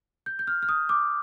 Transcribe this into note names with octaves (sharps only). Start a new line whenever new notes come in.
G6
G6
F6
F6
D#6
D6